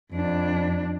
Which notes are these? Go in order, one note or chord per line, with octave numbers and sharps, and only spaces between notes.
F2 D4